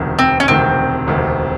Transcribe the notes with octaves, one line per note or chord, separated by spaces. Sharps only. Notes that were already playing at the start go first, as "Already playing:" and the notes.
Already playing: E1 D2 C3 D#3
C4
C#4
E1 D2 C3 D#3 C4
E1 D2 C3 D#3